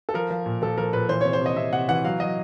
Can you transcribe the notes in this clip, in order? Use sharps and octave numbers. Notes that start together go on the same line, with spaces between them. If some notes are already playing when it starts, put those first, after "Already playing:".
A4
F3 A#4
F3
A#2
F3 A4
F3 A#4
A#2 B4
E3 C5
C3 C#5
C5
C3 D#5
C3 E5
C3 F#5
E3 F#5
F#3 F5
F#3 D#5